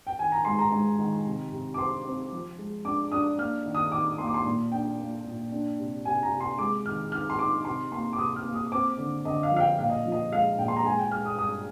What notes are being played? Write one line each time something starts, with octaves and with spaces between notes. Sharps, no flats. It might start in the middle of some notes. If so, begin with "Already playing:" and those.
G5
D#3 G#5
A#5
G#2 C6
A#5
G#2
D#3
C3
C3
D6
C4 C6
C4
F3
G#3
D4 D6
D4 D#6
A#3 F6
D#3
D#6
D#3 D6
A#3 C6
D6
C6
A#2
D4 G5
A#3
A#2
D4
C3
C3 G#5
A#5
C3
C6
G#3 D6
D#3 F6
D#4 F6
C6
D#4 D6
C3 C6
A#3 C6
D6
C3 D#6
F6
A#3
D#6
C4 D6
D3
D3 D#5
F5
F3
F5
G5
A#2 F5
D#5
F3
D#5
G#3 F5
A#2 G5
C6
A#5
G#3 G#5
G5
G#3 F6
D#6
G2 D#6